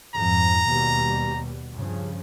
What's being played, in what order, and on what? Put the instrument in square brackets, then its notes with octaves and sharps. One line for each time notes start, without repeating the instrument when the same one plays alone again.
[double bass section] F2 G#2 [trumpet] A#5
[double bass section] D#2 B2 G3
G2 C#3 F3